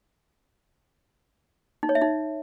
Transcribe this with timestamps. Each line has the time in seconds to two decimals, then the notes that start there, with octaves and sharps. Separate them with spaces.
1.83 D#4
1.89 C#5
1.95 E5
2.02 D#4